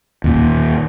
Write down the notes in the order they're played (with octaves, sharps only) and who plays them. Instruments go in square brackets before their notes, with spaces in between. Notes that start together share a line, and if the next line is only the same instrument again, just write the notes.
[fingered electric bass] D#2 A#2